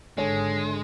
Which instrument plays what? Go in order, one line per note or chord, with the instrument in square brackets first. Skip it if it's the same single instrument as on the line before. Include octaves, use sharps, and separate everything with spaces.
[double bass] G#1 [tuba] D3 [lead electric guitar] G#3 [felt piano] A4 C#5 G#5